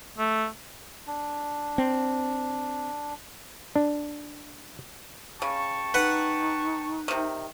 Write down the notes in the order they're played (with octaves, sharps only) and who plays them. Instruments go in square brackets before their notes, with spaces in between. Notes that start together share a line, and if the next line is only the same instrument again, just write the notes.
[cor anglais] A3
[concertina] D4
[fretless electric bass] C4
[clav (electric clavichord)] D4
[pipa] C#3 [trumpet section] G5 A5 C#6
[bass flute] D#4 [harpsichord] B4 F#5
[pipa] C3 D#3